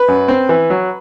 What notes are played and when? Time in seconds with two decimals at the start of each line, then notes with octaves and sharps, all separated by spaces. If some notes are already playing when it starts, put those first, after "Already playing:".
Already playing: B4
0.08 F#2
0.28 C4
0.49 E3
0.70 F#3